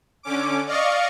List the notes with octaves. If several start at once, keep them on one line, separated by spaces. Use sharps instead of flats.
D3 C#4 D6
D5 D#5 F5 C#6